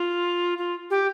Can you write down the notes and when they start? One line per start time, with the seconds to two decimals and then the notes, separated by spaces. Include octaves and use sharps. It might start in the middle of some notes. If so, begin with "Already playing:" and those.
Already playing: F4
0.58 F4
0.90 G4